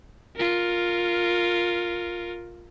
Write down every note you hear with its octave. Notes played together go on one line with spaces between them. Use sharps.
F4 A#4